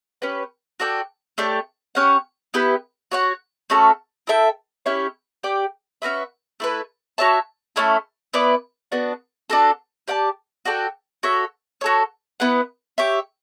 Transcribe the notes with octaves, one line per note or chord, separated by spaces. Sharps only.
C#4 G4 B4
F#4 A4 D5 G5
A3 D4 G4 C#5
C#4 G4 C#5 F#5
B3 E4 G4 B4
F#4 C#5 F#5
A3 C#4 F#4 A4
E4 A4 E5 G5
C#4 E4 G4 C#5
G4 D5 G5
C#4 F#4 B4 E5
A3 E4 B4
F#4 C#5 E5 A5
A3 C#4 E4 A4
B3 E4 B4 D5
B3 D4 F#4
D4 F#4 A4
G4 D5 F#5 A5
F#4 A4 D5 G5
F#4 A4 C#5 E5
F#4 A4 C#5
B3 E4 B4 F#5
G4 C#5 E5